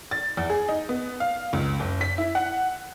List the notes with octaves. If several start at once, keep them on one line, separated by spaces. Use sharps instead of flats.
A6
E2
G#4
D#4
B3
F5
C#2
F#1
B6
E4
F#5